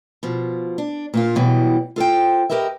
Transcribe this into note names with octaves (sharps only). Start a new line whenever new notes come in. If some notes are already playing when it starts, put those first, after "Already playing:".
B2 F3
D4
A#2 A#3 F4
B2 E3 F#3 G3
F4 A4 C5 G5
G4 A#4 B4 D#5 E5